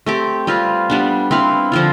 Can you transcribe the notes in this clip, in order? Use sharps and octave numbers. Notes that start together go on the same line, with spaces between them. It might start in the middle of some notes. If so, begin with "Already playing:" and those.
A3 C4 G4
G3 C4 F4 B4
G3 B3 D4
C4 E4 B4 F5
D3 F3 C4 F4